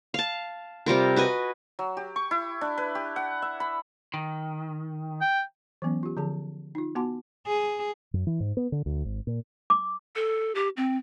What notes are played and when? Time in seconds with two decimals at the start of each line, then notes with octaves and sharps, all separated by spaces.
0.14 F5 A5
0.86 C3 G3 F4 A#4
1.16 F#4 B4 D#5 G#5
1.79 F#3
1.97 G4
2.16 C#6
2.31 E4
2.61 D4
2.78 B4
2.95 G4
3.16 F#5
3.42 E5
3.60 B5
4.14 D#3
5.21 G5
5.82 E3 F#3 B3 C#4
6.03 F4 G4
6.17 D3 F3 G#4 A5
6.75 D#4 F4
6.95 B3 F#4 F#5 A5 C6 D6
7.47 G#4
8.14 F#2
8.27 E3
8.40 G#2
8.57 B3
8.72 D3
8.86 D2
9.05 G#1
9.27 A#2
9.70 D6
10.16 A4
10.55 G4
10.77 C4